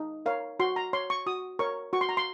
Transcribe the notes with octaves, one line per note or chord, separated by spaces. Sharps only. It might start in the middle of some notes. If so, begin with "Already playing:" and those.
Already playing: D#4
A#4 C#5 F5
F#4 C6
A#5
C#5 C6
C#6
F#4 D#6
A#4 C#5 C#6
F#4 C#6
C6
A#5
C6